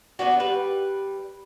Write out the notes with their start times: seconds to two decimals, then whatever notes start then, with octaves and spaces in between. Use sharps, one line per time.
0.19 B3 C#4 D4 F#4
0.40 G3 B4